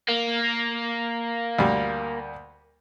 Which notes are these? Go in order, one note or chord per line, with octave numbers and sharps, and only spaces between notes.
A#3
D2 G3